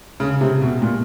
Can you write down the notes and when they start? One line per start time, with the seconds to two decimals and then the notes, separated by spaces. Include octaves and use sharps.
0.20 C#3
0.41 C3
0.62 B2
0.82 A#2